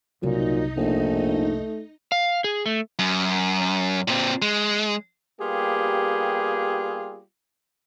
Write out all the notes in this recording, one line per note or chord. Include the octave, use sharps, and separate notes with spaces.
F#1 C2 A#2 F#3 D#4 D#5
A#1 A3
F5
G#4
A3
F#2
A#2 C4
G#3
G3 A#3 B3 F4 G4 G#4